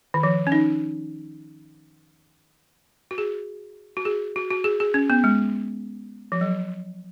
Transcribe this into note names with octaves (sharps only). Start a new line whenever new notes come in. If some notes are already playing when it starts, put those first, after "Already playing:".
D#3
F3
C#4
D#4
F#4
G#4
F#4
G#4
F#4
F#4
G#4
G#4
C#4
B3
G#3
F3
F#3